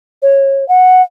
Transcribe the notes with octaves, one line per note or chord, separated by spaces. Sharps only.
C#5
F#5